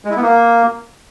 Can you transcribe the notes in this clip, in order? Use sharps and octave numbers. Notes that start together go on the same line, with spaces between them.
G#3
E4
B3
A#3